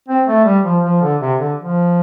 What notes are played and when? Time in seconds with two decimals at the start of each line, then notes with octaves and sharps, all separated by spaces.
0.08 C4
0.28 A3
0.45 G3
0.65 F3
0.83 F3
1.02 D3
1.21 C3
1.39 D3
1.58 F3